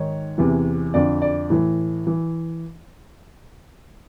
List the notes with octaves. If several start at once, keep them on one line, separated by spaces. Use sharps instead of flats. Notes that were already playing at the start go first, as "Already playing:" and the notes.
Already playing: G#2 D#3 C#5
E2 C3 E3
F2 D3 D5
D5
A2 E3
E3